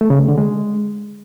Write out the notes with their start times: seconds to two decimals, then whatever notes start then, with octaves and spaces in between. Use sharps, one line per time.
0.01 A3
0.10 C#3
0.19 A3
0.28 D3
0.38 G#3